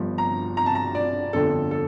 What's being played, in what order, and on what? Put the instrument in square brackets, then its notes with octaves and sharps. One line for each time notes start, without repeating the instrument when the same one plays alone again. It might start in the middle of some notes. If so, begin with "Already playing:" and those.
Already playing: [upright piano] G1 G2 F3
A#5
A#5
A5
A#5
D5
G1 F2 D3 A4
A4